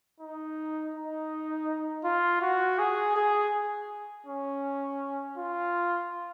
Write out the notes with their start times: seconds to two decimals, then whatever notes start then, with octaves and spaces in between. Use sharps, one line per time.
0.20 D#4
0.94 D#4
2.04 F4
2.42 F#4
2.78 G#4
3.16 G#4
4.26 C#4
5.37 F4